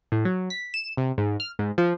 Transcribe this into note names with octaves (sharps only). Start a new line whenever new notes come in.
A2
F#3
B6
E7
C3
G#2
F6
G#2
F3